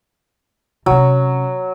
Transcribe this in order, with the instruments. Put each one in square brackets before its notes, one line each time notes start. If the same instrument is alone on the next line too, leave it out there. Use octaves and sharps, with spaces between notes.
[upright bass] C3 C#4 [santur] F#3